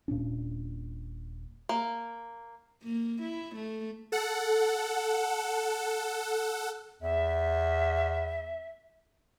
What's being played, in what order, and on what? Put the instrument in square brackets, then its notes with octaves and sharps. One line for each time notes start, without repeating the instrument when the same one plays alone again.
[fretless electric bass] D#1 A#2 C#4 D4
[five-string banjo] A#3
[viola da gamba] A#3
E4
A3
[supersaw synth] A4 F#5
[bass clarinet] E2 [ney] E5